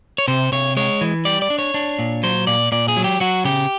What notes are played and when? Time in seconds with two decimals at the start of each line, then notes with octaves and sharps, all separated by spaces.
0.18 C#5
0.28 C3 C5
0.52 C3 C#5
0.77 G#3 C#5
1.01 E3
1.25 G3 D5
1.42 D5
1.50 D4
1.59 C#5
1.74 D4
1.99 A#2
2.23 F#3 C5
2.47 A#2 D5
2.72 A#2 D5
2.88 G#4
2.97 F#3
3.04 G4
3.20 F#3 F#4
3.45 C#3 G4